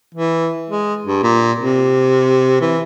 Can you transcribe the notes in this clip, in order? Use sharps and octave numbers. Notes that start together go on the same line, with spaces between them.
E3
G#3
G2
A#2
C3
E3